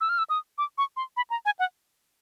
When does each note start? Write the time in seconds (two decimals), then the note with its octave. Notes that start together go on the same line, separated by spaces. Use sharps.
0.01 E6
0.09 F6
0.18 E6
0.30 D#6
0.58 D6
0.78 C#6
0.97 C6
1.17 B5
1.30 A#5
1.45 G#5
1.59 F#5